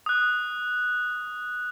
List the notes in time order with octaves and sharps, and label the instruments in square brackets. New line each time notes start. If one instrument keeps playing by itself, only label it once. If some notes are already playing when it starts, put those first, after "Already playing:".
[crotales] D#6 F#6